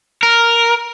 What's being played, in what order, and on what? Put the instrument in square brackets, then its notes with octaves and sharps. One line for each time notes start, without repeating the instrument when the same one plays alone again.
[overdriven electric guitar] A#4